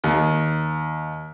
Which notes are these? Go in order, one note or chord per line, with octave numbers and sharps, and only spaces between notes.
D#2